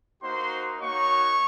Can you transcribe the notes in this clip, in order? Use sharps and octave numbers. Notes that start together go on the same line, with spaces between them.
A#3 D#4 F#4 C5 C6
A#3 D#4 F#4 C#5 C#6